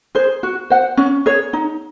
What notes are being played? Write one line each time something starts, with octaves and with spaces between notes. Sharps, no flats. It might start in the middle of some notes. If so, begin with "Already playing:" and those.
G#4 C5
F#4
C5 F#5
C#4
G#4 C#5
D#4